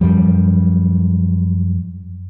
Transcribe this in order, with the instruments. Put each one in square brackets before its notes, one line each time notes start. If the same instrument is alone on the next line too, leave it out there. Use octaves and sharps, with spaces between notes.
[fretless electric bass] F#2 F3 G3